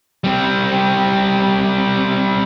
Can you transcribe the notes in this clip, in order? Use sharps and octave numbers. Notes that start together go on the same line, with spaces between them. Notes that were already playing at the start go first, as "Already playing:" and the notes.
G3 C4